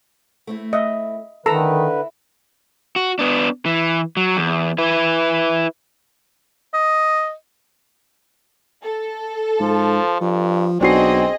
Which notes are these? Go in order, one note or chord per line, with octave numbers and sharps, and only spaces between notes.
A3 C4 E4
D#5 E5
D3 D#3 C4 E4 A4 B4 A#5 E6
F#4
B3 D4
E3
F#3
E2
E4 B4
D#5
A4
G#2 F3
G2 F3
B1 C4 D4 F#4 G#4 D#5 C7